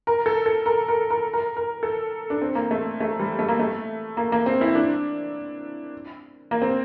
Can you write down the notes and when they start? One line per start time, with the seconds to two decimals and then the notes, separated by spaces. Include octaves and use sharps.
0.07 A#4
0.26 A4
0.46 A4
0.66 A#4
0.88 A#4
1.10 A#4
1.33 A#4
1.57 A#4
1.83 A4
2.30 D4
2.42 C4
2.55 A#3
2.71 A3
3.00 A3
3.19 G3
3.39 A3
3.48 A#3
3.59 A3
4.17 A#3
4.32 A#3
4.46 C4
4.61 E4
4.75 D4
6.51 A#3
6.62 C4